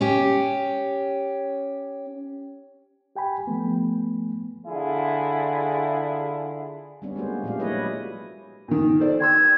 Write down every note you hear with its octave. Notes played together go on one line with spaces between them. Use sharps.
C#4 G4
G4 G5 G#5 B5
F3 A3 B3
D3 E4 F4 G#4
G3 B3 C#4 D4
G#3 A#3 F#4 C5
A#2 F3 A3 D4 G4 F5
F#3 G#3 E4 B4 C#5 D#5
A#2 D#3
A4 C5 D5
G5 C6 E6 G#6